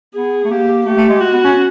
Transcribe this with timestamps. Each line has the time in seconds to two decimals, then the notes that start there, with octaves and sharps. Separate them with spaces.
0.15 B3 G#4
0.45 A3
0.51 A#3 G4
0.86 A3 G4
0.97 A3
1.09 G#3
1.21 F#4
1.33 B3
1.45 C#4